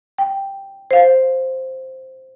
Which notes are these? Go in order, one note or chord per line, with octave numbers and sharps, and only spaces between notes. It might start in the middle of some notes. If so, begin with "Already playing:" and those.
G5
C5 F5